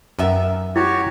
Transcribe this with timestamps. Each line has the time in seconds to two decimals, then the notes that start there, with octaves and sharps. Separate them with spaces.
0.19 F#2 D#3 B3 A#4 E5
0.76 E4 F#4 G4 C#5